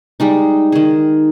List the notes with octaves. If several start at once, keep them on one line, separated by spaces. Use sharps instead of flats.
G3 G#3 D#4
D#3 G#4